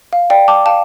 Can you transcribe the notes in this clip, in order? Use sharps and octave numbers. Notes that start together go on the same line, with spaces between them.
F5
D5 G5
A5 D6
F5 A5